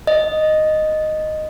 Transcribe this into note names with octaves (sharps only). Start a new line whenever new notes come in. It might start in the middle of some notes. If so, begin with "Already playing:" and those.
D#5